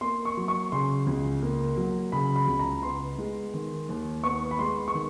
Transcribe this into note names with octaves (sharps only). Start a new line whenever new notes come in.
A#3 C6
C#6
F#3
C#6
C#3 C6
C#2
A#3
F#3
C#3 B5
B5
C#2
A#5
B3 C6
G#3
D#3
D#2
B3 C#6
B5
G#3 C6
C#6
D#3